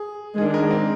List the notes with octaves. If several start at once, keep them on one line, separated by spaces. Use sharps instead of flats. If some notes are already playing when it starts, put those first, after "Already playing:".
Already playing: G#4
D#3 G#3 D4 G#4
A#4
C4